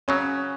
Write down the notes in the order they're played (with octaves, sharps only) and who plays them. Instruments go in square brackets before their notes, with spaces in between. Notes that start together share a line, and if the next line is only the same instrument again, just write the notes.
[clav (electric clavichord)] C#3 F#3 [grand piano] C#4